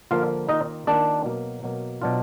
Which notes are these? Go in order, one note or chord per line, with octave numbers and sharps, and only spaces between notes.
D3 F3 A#3 F4 F5
D#3 A#3 D#4 F4 D#5
D#3 A#3 D4 F4 D5
B2 F#3 A#3
B2 F#3 A#3
B2 F#3 D4 F4